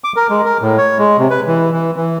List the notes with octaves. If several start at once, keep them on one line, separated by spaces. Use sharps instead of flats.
D6
A#4
G#3
A#4
A2
C#5
G#3
C3
B4
E3
E3
E3